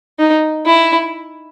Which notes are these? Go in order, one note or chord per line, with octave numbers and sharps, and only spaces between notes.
D#4
E4